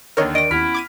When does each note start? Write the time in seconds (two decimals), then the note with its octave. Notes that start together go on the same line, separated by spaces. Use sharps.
0.17 D#2 D3 D#3 A#4 C#5 D#5
0.35 D#3 D4 D#5 A#6 D7
0.51 D#2 B3 C#4 E4 F6 B6
0.74 D6 G#6 D#7